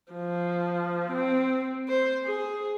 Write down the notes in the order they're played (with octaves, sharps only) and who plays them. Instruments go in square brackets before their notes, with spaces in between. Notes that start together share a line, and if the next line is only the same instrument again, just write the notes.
[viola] F3
C4
C5
G#4